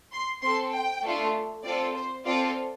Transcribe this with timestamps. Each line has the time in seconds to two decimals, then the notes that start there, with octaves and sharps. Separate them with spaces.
0.13 C6
0.43 C4 A4 C6
0.73 G5
1.04 A3 D4 F4 A4
1.64 C4 F4 A4 D5
1.95 C5
2.26 C4 F4 A4 D5